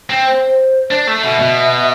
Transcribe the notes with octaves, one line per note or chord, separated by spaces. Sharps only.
C4
C5
D4
A3
B2 E5
B2